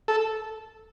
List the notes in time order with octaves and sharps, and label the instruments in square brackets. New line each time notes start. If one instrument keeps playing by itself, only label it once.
[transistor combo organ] A4